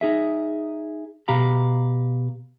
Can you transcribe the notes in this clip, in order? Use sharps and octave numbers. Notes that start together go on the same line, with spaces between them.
D#4 G#4 E5
B2 G4 F5 A#5 B5